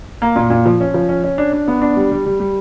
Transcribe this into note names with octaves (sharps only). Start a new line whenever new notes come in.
A#3
A#2
A#2
F3
C#4
F3
C#4
C#4
D4
D4
B3
D4
G3
G3
G3
G3